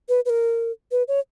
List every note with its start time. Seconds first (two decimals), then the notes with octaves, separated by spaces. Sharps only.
0.09 B4
0.25 B4
0.29 A#4
0.91 B4
1.08 C#5